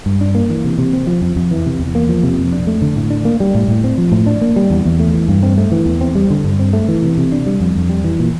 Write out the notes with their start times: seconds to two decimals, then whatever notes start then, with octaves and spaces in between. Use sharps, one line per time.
0.06 G2
0.21 D4
0.35 A#3
0.50 E3
0.64 C3
0.79 C3
0.93 C4
1.07 F3
1.22 F2
1.36 F2
1.51 E3
1.66 C3
1.79 E2
1.95 A#3
2.09 F3
2.23 C3
2.39 F2
2.52 D4
2.67 A3
2.82 D3
2.96 A2
3.10 D4
3.25 A#3
3.40 G3
3.54 A2
3.68 A2
3.84 C4
3.98 F3
4.12 A2
4.26 D4
4.41 A#3
4.56 G3
4.70 E2
4.85 E2
4.99 A3
5.14 E3
5.28 G2
5.43 C4
5.58 A3
5.72 E3
5.86 E2
6.01 C4
6.15 G3
6.30 D3
6.44 G2
6.59 C4
6.73 A3
6.88 E3
7.02 C3
7.18 C3
7.32 D4
7.46 G3
7.60 F2
7.76 F2
7.89 G3
8.04 E3
8.19 A#2